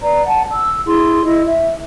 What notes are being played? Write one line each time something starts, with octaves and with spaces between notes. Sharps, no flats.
B4 D5 A#5
F#5 A5
E6
E4 G#4 C6
E4 D#5
E5